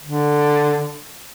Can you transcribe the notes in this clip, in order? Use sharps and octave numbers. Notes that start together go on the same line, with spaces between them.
D3